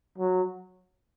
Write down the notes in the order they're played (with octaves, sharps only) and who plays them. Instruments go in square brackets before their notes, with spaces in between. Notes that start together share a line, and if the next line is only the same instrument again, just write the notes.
[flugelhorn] F#3